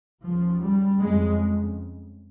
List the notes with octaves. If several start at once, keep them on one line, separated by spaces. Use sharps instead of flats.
D#2 C#3 F3
G3
F2 C#3 G#3